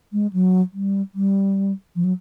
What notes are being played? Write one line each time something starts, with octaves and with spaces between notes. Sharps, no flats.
G#3
F#3
G3
G3
F3
F#3